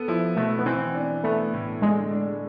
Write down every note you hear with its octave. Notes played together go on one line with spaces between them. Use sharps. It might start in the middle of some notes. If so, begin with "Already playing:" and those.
Already playing: B3 A4
F3 E4
B2 A3
B3
E3 C4
D4
A3 B3
A2
D3 G#3
D4